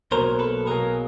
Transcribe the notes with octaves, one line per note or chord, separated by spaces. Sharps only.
B1 B2 F#3 A#3 A#4 C5
A4 B4
B1 B2 F#3 A#3 G#4 A#4